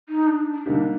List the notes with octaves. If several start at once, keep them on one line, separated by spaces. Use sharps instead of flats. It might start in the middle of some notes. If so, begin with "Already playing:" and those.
D#4
D4
D4
D3 G3 A#3 D4 D#4 G4